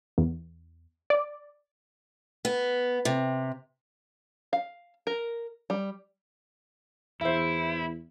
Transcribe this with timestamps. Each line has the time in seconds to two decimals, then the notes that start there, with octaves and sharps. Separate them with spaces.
0.18 E2
1.10 D5
2.45 B3
3.05 C3
4.53 F5
5.07 A#4
5.70 G3
7.21 E2 E4 C5 E5